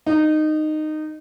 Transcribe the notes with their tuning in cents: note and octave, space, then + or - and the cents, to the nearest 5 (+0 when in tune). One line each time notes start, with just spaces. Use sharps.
D#4 -15